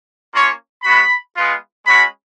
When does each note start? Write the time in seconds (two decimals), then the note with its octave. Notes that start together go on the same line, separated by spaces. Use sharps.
0.33 A#3 C#4 F4 C#5
0.83 G#3 B3 F#4 B5
1.35 G#3 B3 F4
1.86 G#3 C#4 F#4 B5